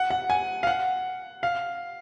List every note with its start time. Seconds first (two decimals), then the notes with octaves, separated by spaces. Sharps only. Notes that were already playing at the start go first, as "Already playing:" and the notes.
Already playing: F#5
0.10 F#5
0.30 G#5
0.63 F5
0.67 F#5
1.43 F5